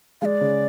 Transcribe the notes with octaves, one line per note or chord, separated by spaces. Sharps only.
G#3 D5 F5
C#3